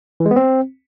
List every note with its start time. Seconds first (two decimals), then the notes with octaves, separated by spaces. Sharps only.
0.20 E3
0.26 G#3
0.31 B3
0.36 C4